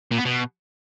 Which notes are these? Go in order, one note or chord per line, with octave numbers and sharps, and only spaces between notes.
A#2
B3
B2